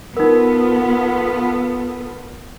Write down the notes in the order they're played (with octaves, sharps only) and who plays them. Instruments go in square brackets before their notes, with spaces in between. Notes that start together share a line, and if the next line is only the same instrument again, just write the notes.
[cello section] B3 F4 A4 [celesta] D#4 A#4